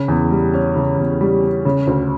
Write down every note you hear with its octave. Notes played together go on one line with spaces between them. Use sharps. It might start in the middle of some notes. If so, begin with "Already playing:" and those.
Already playing: C#3
E2
G3
C#4
C#3
E2
G3
C#4
C#3
D2